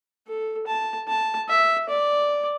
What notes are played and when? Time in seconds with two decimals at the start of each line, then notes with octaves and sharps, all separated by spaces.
0.28 A4
0.68 A5
1.08 A5
1.49 E5
1.89 D5